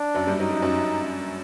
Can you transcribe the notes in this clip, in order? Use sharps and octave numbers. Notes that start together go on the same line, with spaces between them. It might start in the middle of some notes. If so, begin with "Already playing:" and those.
Already playing: D4
F#2 F#3
G2 G3
F#3 D#4
G3
F#2 F#3